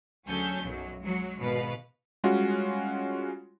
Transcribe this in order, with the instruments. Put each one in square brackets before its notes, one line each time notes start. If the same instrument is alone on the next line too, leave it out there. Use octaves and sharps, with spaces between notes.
[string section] D2 F#3 C#4 G#4 A4 G6
B1 F#2 F#3
F#3 G#3
G#1 B2 B4 F5
[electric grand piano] G3 G#3 C#4 F4 F#4